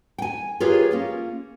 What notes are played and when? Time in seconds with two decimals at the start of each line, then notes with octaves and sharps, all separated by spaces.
0.18 G5 G#5
0.60 F4 G4 G#4 A#4 B4 C#5
0.91 A#3 C#4 F4